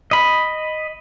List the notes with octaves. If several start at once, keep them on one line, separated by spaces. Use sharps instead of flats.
D#5 B5